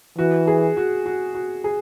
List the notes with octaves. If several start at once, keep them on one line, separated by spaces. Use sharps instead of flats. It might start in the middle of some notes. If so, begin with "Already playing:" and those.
E3 F#4
G#4
F#4
F#4
F#4
G#4